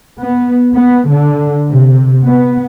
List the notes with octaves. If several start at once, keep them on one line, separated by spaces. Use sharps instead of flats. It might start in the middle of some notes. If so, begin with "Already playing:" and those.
B3
B3
D3
C3
B3